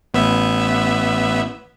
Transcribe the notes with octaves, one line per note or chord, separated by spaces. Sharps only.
A1 B3 E5